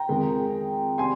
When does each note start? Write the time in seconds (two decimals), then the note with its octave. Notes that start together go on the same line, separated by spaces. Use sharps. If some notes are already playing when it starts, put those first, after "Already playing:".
Already playing: G5 A#5
0.09 F2 D#3 G#3
0.98 C3 G3 G#5 C6